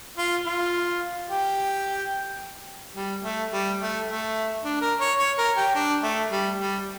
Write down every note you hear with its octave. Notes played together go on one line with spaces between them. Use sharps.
F4
F4
G4
G3
A3
G3
A3
A3
D4
A#4
C#5
C#5
A#4
G4
D4
A3
G3
G3